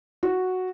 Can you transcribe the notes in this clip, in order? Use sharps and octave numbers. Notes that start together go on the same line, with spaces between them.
F#4